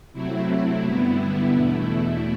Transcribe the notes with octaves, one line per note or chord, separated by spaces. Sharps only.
C3 F#3 A3 C4 E4
G2 D3 G3 B3 E4
E2 B2 A3 E4